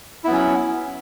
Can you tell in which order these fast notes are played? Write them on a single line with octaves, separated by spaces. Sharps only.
E4 B3 F#3 C#4